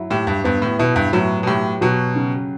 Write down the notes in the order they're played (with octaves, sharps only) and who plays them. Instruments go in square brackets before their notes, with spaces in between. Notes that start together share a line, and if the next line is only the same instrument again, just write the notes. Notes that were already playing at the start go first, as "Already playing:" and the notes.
Already playing: [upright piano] F#3 E4
[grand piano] A2 [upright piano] G4
[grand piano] G2
[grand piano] G2 [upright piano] B3
[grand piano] A2
[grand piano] B2 [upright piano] E4
[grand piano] G2
[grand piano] A2 [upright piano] F#3
[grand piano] B2
[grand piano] A2 [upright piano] G4
[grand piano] B2 [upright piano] F#3
[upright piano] C#3